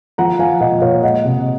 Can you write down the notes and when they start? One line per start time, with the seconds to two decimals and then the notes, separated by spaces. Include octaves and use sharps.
0.18 F3 F#5 A#5
0.39 F3 F5 G#5
0.60 A#2 D#5 F#5
0.81 A#2 C#5 F5
1.03 G#3 D#5 F#5
1.25 C3